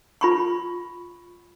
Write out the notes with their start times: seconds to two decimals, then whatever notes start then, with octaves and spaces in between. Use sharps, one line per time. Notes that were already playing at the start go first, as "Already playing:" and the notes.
0.21 F4 B5 C#6